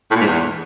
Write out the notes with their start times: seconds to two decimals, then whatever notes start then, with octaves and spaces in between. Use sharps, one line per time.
0.11 A2
0.16 A#2
0.21 G#2
0.26 E2